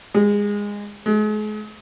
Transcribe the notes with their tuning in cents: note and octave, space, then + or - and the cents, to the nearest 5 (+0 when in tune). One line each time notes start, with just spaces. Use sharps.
G#3 -20
G#3 +40